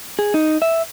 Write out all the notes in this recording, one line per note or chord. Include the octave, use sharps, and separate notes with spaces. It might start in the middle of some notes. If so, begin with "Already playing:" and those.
G#4
D#4
E5